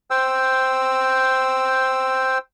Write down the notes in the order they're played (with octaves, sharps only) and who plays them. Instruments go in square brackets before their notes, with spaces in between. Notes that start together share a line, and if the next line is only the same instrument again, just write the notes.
[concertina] C5 G5 E6